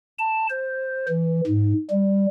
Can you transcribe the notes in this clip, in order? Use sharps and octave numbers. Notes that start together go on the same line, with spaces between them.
A5
C5
E3
G#2
G3